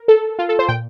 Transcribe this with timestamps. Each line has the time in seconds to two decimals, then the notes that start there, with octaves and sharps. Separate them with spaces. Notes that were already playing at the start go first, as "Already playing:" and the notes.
Already playing: A#4
0.08 A4
0.39 F4
0.49 A4
0.59 C5
0.68 A#2 G5